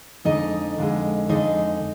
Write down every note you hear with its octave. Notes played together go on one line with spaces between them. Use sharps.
F2 D3 G#3 D#4 D#5
F2 D3 G#3
F2 D3 G#3 D#4 D#5